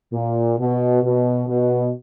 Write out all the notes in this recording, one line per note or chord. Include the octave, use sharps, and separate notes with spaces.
A#2
B2
B2
B2